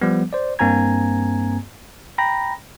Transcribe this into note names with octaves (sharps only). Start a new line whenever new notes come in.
F3 G3 B3
C5 D5
G2 A#3 C4 G#5 A#5 G#6
G5 A#5 B5 A#6